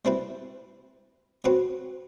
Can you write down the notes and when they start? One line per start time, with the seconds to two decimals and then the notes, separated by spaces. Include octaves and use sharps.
0.05 G3 C4 E4 B4
1.44 F#3 C4 F#4 B4